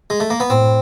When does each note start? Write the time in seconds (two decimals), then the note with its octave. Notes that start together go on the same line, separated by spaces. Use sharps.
0.10 G#3
0.20 A3
0.30 A#3
0.40 B3
0.50 A2 C4